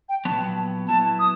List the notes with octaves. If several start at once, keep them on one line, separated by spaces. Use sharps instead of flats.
G5
A#2 F#3 B3 A5
F#3 B3 E4 A5
D#6